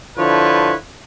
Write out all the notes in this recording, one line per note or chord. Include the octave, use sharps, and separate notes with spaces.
D3 F3 E4 B4 C#5